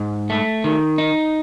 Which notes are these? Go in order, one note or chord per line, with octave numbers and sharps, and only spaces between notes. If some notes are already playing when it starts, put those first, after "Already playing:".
Already playing: G#2
A3
D#3
D#4